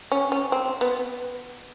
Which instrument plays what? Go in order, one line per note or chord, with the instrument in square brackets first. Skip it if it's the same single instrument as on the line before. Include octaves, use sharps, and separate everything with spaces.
[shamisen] C#4
C#4
C4
B3